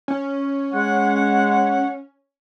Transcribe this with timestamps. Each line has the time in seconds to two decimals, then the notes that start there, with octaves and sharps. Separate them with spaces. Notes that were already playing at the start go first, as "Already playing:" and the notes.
0.08 C#4
0.73 G#3 F#5